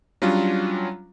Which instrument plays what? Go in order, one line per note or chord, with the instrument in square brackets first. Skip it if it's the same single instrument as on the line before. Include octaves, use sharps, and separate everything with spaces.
[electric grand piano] F#3 G3 C#4 D4 F4